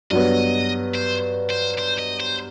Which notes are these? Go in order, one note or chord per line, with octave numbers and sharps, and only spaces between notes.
G2 F#3 B3 D#5
C5
C5
C5
D#5
C5